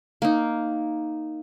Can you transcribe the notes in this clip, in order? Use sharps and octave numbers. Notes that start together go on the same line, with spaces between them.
A#3 D#4